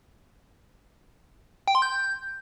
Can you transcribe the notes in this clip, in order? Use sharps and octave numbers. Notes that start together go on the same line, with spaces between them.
G5
C6
G6